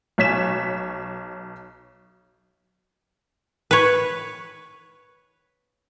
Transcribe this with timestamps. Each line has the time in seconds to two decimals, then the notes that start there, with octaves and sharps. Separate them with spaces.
0.18 B1 C#5 B6 E7
3.71 B4 C#5